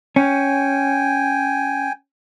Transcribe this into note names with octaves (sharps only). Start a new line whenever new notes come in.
C#4 G5 G#5